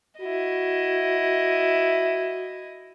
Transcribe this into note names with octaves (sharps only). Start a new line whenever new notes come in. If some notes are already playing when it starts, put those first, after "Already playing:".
E4 F#4 D#5